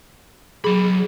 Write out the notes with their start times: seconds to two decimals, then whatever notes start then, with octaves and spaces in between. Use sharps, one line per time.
0.64 F#3 G#4 B5